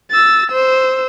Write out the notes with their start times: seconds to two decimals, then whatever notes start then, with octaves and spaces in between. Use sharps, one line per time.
0.11 E6 A6
0.50 C5 E6